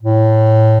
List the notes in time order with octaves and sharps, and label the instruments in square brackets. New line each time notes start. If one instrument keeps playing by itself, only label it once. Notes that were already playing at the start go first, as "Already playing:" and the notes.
[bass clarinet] A2